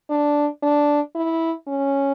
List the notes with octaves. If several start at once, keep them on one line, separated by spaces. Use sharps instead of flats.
D4
D4
E4
C#4